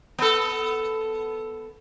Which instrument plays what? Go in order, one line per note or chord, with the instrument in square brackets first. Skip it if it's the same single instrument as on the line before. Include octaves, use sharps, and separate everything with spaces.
[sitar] B3 A4